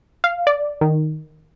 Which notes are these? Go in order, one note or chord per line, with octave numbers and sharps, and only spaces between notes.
F5
D5
D#3